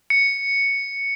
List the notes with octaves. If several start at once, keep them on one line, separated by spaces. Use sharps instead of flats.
C#7